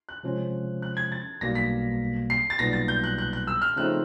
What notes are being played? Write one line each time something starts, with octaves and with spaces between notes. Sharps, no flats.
F#6
C3 F3 G#3 C#4
F#6
G#6
A6
B1 B2 G3 A#3 A#6
B6
C7
A6
B1 A#2 G3 B3 A#6
A6
G6
F#6
F#6
F#6
E6
F6
C#3 F3 A3 C4 D#4 F#6